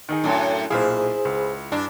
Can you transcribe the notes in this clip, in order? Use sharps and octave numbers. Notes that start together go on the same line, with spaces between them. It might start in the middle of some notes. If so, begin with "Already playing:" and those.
D#3 D#4 G#4
F#2 A2 D4
B1 A#2 E4 G#4 C5 F5
C#2
G2 D4